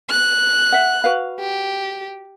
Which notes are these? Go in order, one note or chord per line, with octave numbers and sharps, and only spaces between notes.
F#6
E5 F#5
F#4 B4 F5
G4